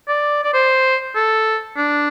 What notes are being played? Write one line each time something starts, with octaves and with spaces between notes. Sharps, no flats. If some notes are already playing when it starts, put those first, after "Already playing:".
D5
D5
C5
A4
D4